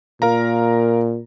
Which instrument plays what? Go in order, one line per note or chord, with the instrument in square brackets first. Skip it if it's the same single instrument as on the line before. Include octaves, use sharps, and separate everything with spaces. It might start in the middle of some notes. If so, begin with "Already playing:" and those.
[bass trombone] A#2 [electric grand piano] A#4 F5 A#5